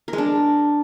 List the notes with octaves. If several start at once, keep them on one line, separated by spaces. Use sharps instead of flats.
A#4
G#3
D4